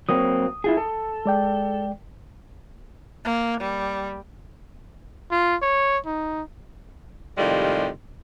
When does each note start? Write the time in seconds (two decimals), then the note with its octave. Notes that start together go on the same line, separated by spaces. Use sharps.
0.09 F#3 A#3 C4 D#6
0.64 E4 F4 G#4
0.77 A4
1.26 G#3 D5 G5
3.25 A#3
3.60 G3
5.31 F4
5.62 C#5
6.06 D#4
7.38 A2 C3 D#3 G3 G#3 F4